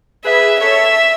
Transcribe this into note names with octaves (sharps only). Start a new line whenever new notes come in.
G#4 B4 E5
A4 C#5 E5